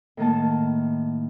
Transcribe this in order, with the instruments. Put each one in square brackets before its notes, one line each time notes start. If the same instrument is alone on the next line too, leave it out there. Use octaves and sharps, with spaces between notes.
[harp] A2 D#3 A#3 A5